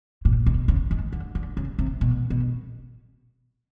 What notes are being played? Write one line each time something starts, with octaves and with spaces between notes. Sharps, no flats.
A#2
B2
C#3
D#3
D3
D3
C#3
C3
B2
B2